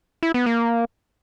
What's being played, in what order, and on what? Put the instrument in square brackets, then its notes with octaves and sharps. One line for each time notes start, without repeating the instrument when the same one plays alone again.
[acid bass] E4
B3
A#3